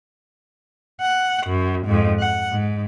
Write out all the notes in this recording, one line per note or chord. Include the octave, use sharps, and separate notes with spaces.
F#5
F#2
F2 G#2
F#5
G#2